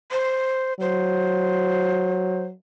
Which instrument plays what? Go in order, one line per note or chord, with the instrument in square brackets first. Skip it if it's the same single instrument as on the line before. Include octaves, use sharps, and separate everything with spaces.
[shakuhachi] C5
[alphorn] F#3 [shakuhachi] C5